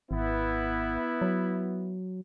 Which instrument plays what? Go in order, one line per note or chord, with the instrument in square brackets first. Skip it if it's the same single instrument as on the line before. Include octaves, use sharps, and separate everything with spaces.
[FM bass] G#1 [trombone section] B3 E4
[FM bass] F#3